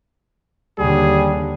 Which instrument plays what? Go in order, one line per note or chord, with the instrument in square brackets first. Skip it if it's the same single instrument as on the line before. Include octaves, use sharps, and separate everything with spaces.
[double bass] D#2 D3 [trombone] G3 [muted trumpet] G#4